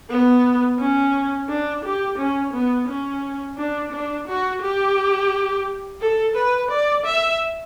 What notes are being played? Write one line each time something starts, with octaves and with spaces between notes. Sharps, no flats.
B3
C#4
D4
G4
C#4
B3
C#4
D4
D4
F#4
G4
A4
B4
D5
E5